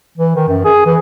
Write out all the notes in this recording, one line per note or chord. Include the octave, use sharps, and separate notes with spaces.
E3
D#3
F#2
G#4
E3